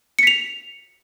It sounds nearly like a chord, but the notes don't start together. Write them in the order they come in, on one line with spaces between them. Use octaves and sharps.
C#7 B6 F7